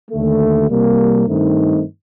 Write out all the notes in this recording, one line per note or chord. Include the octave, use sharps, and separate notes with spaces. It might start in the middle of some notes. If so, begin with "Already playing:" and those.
D#2 D3 A3
C2 C3 G3 A#3
G2 D#3 A3 C4 D#4